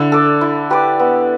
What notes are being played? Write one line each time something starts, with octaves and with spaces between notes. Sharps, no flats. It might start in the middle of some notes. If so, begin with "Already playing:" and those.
Already playing: D3 E4
A4 D5
E4
G4 B4 D5
B3